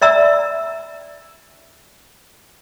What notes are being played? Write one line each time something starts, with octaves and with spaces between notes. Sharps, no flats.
D5 E5 A#5 E6